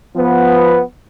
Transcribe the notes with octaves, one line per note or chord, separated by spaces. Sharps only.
F3 B3